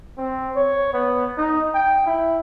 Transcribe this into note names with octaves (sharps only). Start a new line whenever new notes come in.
C4
C#5
B3
D#4
G5
E4